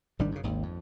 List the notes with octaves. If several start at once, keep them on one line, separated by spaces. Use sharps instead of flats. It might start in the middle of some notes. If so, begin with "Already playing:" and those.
G#1 D#3 G3 D4
F#2 C#3
G#1 D#2
F2